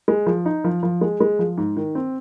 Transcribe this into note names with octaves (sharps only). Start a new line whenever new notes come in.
G#3
F3
D#4
F3
F3
G#3
G#3
F3
G#2
D#3
C4